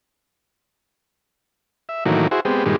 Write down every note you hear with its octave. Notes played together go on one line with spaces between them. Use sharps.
E5
A2 D#3 E3 F#3 A#3
E4 F#4 G#4 C5
G#3 B3 C4 G4
G2 A#2 D#3 G3 G#3